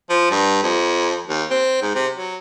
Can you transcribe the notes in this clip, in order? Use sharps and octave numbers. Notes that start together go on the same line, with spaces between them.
F3
G2
F2
D#2
C4
G#2
C3
F#3